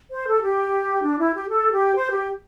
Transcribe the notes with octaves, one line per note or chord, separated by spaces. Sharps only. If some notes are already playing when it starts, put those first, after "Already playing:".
C5
A4
G4
D4
E4
G4
A4
G4
C5
G4